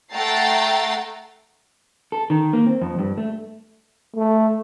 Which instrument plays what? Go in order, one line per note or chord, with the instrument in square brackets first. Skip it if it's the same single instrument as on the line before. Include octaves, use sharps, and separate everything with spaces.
[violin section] A3 F#5 G5 A#5 A6 C7
[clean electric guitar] A4
D#3
A#3
C4
F2
G2
A3
[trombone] A3